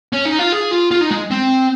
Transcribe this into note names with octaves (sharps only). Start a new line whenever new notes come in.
C#4
D#4
F4
G#4
F4
F4
D#4
G#3
C4